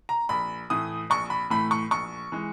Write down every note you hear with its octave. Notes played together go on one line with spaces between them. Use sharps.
A#5
A#1 B5
A2 E3 A3 D#6
A#1 C#6
B5
A2 E3 A3 B5
C#6
A#1 C#6
E3 G#3